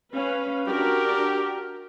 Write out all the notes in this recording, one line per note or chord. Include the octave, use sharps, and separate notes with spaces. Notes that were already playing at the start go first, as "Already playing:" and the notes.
C#4 B4 F5
D4 F#4 G4 A#4